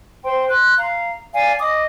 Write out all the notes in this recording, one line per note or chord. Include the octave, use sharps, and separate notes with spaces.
C5 G5 C6
C6 F#6
F5 A#5
D5 F5 G#5
D#5 D6 D#6